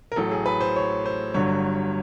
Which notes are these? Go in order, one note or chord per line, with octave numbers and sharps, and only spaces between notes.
A#4
A1 A2 F#3 A4
G#4
B4
C5
C#5
C5
G1 G2 D3 F#3 C#5